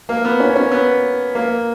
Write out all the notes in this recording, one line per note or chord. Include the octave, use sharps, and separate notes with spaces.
A#3
B3
C#4
C#4
B3
A#3